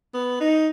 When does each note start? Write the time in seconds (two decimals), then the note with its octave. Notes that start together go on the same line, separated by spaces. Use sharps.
0.14 B3
0.41 D#4